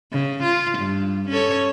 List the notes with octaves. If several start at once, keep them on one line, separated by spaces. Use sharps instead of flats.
C#3
F4
G2
C#4 A4 C#5